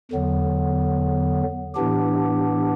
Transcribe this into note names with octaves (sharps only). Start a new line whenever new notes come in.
E2 D3 F#3 B3
A2 E3 B3 D4 G4